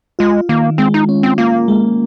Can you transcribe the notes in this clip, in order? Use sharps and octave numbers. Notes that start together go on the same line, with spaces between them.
G#3 F4
D#3 A#3
G#3 C4
D#4
C#4
C4
A#3 F4
G#3